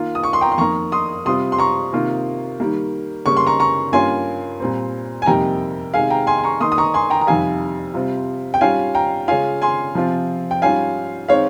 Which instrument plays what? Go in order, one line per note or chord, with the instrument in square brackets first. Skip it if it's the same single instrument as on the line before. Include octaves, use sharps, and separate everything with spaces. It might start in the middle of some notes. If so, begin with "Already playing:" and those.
Already playing: [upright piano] D#3 A#3 F4
D#6
C#6
C6
G5 A#5
C6
F2 D#3 A#3 A#5 C#6
C6 D#6
C3 G3 C4 F4 C6 D#6
C6
A#5 C#6
C3 D#3 A#3 F4
D#3 G3 A#3
C#3 G3 A#3 C#6
C6
A#5 C#6
A#5 C#6
G2 G3 A#3 C#4 F4 G#5 C6
A#2 G3 C4
G#5
F2 C3 G3 A#3 D#4 G5 A#5
C3 D#3 G#3 F5 G#5
G5 A#5
G#5 C6
C6
A#5 C#6
D#3 A#3 D#4 C6 D#6
D#6
A#5 C#6
G#5 C6
G5 A#5
A#5
F2 C3 D#3 G3 F5 G#5
C3 G3 C4 F4
G5
G#2 G3 C#4 F4 F5 G#5
G5 A#5
C#3 G#3 C#4 F4 F5 G#5
G#5 C6
C3 F3 C4 F4
G5
G#2 G3 C#4 F4 F5 G#5
D#3 G#3 C4 C#5 F5